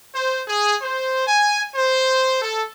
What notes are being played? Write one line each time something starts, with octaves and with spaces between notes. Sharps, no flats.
C5
G#4
C5
G#5
C5
A4